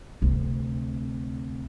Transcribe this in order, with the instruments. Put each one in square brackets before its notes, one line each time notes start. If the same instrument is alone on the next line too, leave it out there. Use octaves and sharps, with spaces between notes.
[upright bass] D2 C3